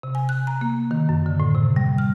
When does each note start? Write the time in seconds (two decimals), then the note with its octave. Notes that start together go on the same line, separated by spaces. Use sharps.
0.03 C3
0.15 G#5
0.29 F#6
0.47 A#5
0.61 A#3
0.91 D#3
1.09 F#2
1.26 D3
1.40 A2
1.55 C3
1.76 G3
1.98 F6